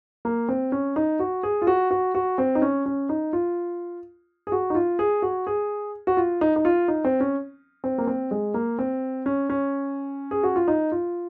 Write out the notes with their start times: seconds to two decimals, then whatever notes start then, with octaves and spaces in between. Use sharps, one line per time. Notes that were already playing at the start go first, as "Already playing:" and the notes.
0.25 A#3
0.49 C4
0.72 C#4
0.96 D#4
1.19 F#4
1.43 G#4
1.62 F4
1.67 F#4
1.91 F#4
2.15 F#4
2.38 C4
2.55 D#4
2.62 C#4
2.86 C#4
3.09 D#4
3.33 F4
4.47 G#4
4.52 F#4
4.70 D#4
4.75 F4
4.99 G#4
5.22 F#4
5.47 G#4
6.07 F#4
6.17 F4
6.41 D#4
6.56 D#4
6.65 F4
6.88 D#4
7.05 C4
7.20 C#4
7.84 C4
7.98 A#3
8.07 C4
8.31 G#3
8.54 A#3
8.79 C4
9.26 C#4
9.49 C#4
10.31 G#4
10.43 F#4
10.56 F4
10.68 D#4
10.92 F4